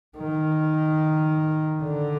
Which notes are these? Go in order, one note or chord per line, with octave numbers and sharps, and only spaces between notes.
D#3
D3